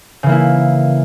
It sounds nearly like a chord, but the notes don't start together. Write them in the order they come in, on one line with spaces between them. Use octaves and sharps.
C#3 E3 A#3 E4